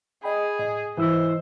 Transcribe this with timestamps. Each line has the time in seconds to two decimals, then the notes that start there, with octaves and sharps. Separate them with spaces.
0.23 G#4 D#5 G5 B5
0.59 A2 D#5
0.97 G#2 E3 E4 C5 E6